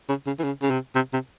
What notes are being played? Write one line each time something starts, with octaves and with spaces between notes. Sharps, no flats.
C#3
C#3
E3
C#3
C#3
C3
C3
C3